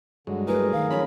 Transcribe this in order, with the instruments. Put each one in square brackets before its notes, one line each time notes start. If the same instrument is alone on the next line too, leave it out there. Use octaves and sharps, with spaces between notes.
[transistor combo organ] G2 F#3 G#3 [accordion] D3
[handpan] A3 E4 [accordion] G#4 A#4 [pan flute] B4
[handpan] D#3 F#3 [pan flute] F5
[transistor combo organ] F3 C#4 B5 [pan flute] C#5